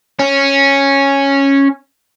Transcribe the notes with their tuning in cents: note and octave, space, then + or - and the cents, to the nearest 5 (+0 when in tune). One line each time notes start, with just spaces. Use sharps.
C#4 -5